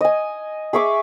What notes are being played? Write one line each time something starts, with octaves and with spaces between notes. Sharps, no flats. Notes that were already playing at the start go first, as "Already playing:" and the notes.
D#5 G#5
G#4 E5 C#6 D6